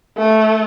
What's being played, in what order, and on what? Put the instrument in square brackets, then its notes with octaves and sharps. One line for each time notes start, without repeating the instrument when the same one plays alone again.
[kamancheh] A3